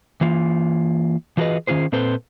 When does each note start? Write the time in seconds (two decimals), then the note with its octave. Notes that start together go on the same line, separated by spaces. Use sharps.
0.21 E3 A#3 F4
1.37 E3 F4 F#4 G#4 B4 D#5
1.67 D#3 C#4 F4 G#4 C5
1.92 A#2 C4 A4 B4 C5